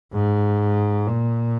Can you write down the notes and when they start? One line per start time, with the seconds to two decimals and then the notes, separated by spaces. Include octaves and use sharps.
0.14 G#2
1.07 A#2